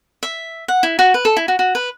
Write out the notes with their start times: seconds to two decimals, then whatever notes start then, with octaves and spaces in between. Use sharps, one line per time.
0.23 E5
0.68 F#5
0.83 E4
0.99 F#4
1.14 B4
1.25 A4
1.37 E4
1.48 F#4
1.59 F#4
1.75 B4